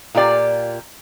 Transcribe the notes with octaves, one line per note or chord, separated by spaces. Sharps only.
A#2 F4 G4 D5